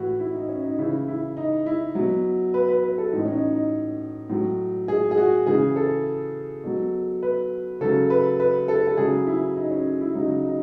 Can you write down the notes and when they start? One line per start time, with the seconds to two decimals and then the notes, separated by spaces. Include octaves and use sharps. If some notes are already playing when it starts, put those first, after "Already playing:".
Already playing: A2 E3 E4 F#4
0.20 E4
0.35 D#4
0.49 C#4
0.64 D#4
0.78 C#3 E3 E4
1.08 E4
1.37 D#4
1.66 E4
1.95 B2 F#3
2.54 B4
2.69 B4
2.83 B4
2.98 A4
3.13 A2 E3 D#4
3.25 C#4
3.32 D#4
3.52 D#4
4.30 A2 F#3
4.88 G#4
5.11 G#4
5.17 F#4
5.47 C#3 E3 G#4
5.76 A4
6.64 B2 F#3
7.23 B4
7.81 C#3 F#3 A4
8.10 B4
8.40 B4
8.68 A4
8.87 A4
8.97 C#3 F#3 G#4
9.27 E4
9.56 D#4
9.71 C#4
10.01 E4
10.15 C#3 F#3 D#4
10.44 D#4